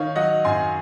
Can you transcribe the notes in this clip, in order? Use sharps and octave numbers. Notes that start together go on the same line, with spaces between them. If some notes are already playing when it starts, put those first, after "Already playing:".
Already playing: D#3 C#5 F5
F#3 D#5 F#5
F#2 G#5 C6